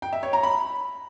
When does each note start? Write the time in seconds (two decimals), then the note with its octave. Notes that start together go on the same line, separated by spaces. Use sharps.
0.02 G5
0.13 E5
0.23 C#5
0.33 A#5
0.43 B5